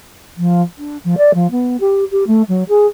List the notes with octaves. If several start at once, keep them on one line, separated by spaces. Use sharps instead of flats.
F3
D4
F3
D5
F3
B3
G4
G4
A3
F#3
G#4